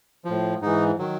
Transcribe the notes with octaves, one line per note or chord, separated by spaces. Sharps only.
A2 F3
G#2 E3 D#4
D#3 F#3